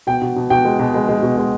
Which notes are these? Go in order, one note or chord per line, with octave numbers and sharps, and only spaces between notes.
B2 G5
B2
B2
B2 G5
G#3
B2
G#3
G#3
B2
G#3